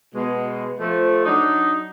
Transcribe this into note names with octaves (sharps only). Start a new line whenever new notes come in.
B2 G#3
F3 A3
F#3 D4 D#4